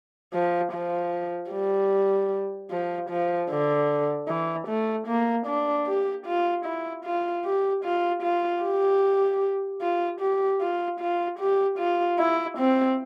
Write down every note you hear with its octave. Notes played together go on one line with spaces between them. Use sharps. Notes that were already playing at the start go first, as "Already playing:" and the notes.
F3
F3
G3
F3
F3
D3
E3
A3
A#3
D4
G4
F4
E4
F4
G4
F4
F4
G4
F4
G4
F4
F4
G4
F4
E4
C4